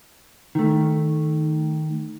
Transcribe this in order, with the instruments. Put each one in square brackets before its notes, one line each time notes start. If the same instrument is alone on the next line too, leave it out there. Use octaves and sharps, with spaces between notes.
[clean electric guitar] D#3 A3